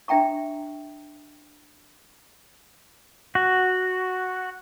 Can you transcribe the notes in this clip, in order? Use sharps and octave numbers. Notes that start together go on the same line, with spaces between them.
D4 E5 G5 A#5 C#6
F#4